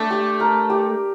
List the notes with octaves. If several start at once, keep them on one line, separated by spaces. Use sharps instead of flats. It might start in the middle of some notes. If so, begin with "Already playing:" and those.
Already playing: A3 D4
G4
A#4
G4